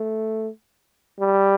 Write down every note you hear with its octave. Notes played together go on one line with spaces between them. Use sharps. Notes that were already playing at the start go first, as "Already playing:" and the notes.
Already playing: A3
G3